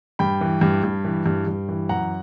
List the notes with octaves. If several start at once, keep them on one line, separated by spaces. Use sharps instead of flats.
G2 G5 B5
E3
G2
G2
E3
G2
G2
E3
F#2 F#5 A#5